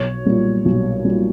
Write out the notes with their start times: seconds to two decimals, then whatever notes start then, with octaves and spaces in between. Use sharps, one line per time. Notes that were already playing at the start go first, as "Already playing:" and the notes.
Already playing: B1 C#5
0.25 A#2 G3
0.65 B1
1.05 A#2 G3